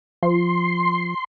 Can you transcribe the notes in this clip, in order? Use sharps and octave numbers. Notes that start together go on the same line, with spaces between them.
F3 C6